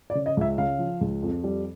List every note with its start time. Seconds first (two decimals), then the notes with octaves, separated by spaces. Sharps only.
0.10 D5
0.15 C#3
0.26 D#5
0.37 C#2 E5
0.58 C#3 F5
0.79 F3
1.01 C#2
1.23 F2
1.44 G3